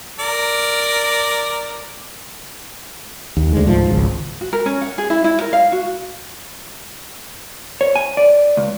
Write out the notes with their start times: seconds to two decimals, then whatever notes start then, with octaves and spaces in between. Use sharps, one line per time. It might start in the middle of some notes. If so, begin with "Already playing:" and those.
0.19 A#4 D5
3.37 D#2
3.53 D2 G#3
3.66 C#2 G#2 F3
3.89 G#1 C#2
4.41 F#4
4.53 A#4
4.66 C#4
4.81 F#5
4.98 G#4
5.10 E4
5.24 E4
5.41 A#4
5.53 F5
5.72 F#4
7.81 C#5
7.96 G#5
8.17 D5
8.57 C#2